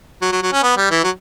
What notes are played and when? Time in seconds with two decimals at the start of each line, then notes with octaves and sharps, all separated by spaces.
0.22 F#3
0.32 F#3
0.42 F#3
0.52 C#4
0.63 B3
0.76 G3
0.90 E3
1.04 F#3